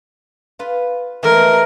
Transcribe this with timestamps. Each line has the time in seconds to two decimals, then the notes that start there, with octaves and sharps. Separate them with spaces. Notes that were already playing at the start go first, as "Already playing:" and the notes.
0.59 F4 B4
1.23 E3 G#3 A3 A#4